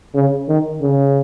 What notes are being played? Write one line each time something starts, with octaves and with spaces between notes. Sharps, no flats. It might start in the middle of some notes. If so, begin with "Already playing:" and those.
C#3
D#3
C#3